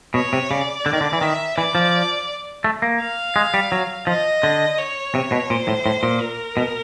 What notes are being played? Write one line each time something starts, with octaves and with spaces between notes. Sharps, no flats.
B2 C#5
C3
C#3 D5
D3
D#3
D3
E3
D#3 E5
E3 D5
F3
A3
A#3
F5
G#3
G3
F#3
F3 D#5
D3
C#5
C3
B2
A#2 C5
A2
A2
A#2
A#4
B2